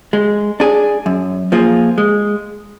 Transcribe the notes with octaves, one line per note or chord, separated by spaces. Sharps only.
G#3
D4 G#4
F#2
F3 A#3 F4 G#4
G#3